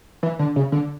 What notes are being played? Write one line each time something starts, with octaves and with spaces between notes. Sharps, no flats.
E3
D3
C#3
D3